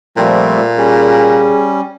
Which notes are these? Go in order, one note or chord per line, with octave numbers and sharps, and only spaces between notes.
A#2 F3 G3 A3 C4
G3 C#4 G#4